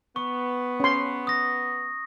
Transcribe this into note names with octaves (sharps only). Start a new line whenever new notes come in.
B3 C#6
C#4 C6
D#6 A#6